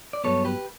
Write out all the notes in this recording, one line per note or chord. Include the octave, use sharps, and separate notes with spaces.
D5
G2 F#3 B3 A4 C#5
G4 B4